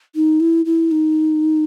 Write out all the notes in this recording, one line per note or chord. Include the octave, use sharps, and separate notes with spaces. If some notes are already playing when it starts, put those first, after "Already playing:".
D#4
E4
E4
D#4